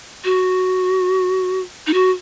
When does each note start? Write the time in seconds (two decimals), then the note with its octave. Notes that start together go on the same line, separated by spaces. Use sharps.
0.24 F#4
1.87 D#4
1.94 F#4